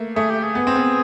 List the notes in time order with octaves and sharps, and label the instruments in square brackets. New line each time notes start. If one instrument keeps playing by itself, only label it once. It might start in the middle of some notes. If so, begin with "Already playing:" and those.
Already playing: [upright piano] A3 A#3
[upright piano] A3 [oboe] G#4
[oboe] G4
G#4
[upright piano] B3
C4
B3